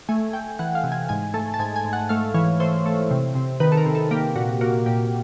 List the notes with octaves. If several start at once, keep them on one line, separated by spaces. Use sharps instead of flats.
A3 G#5
A3 G5
E3 F#5
F5
C3
G#5
G#2 G#5
A3 A5
A5
G#2 G#5
G#5
G#2
F#5
A3 F5
E3 C#5
A3 C5
A3
C3
C3
D#3 B4
A4
A#4
C3
A4
A#3 G4
A#2 F#4
A#3 F#4
A#2 G4